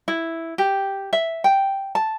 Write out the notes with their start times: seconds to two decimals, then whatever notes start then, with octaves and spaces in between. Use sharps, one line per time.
0.08 E4
0.58 G4
1.13 E5
1.44 G5
1.95 A5